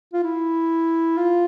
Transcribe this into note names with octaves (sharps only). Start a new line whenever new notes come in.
F4
E4
F4